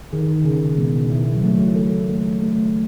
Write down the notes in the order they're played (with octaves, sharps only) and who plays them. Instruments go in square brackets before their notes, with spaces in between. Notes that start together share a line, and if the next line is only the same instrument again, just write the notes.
[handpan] D#3 [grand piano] G#4
[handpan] C#3 [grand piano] G#4
[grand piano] B2
E4
[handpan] F#3
[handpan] E3 [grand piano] A3
[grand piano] A4
A3
A3